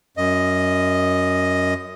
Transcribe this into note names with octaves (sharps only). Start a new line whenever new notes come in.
F#2 D#5